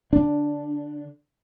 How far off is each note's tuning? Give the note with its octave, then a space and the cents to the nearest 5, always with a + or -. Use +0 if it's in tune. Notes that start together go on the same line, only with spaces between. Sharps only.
D3 -15 D4 +0